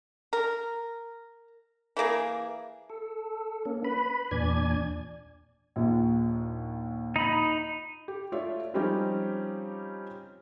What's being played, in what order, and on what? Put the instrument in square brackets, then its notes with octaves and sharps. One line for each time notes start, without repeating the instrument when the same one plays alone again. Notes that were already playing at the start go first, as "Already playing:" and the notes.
[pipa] A#4
E3 A3 A#3 G#4
[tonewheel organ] A4
A#3 C#4
B4 B5
E2 A#2 D4 D5 G#5 G#6
[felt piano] A#1 D#2
[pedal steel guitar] D#4 B5
[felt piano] G4
A3 F4 C#5 D5 E5
F3 G3 C4 C#4 D#4 G4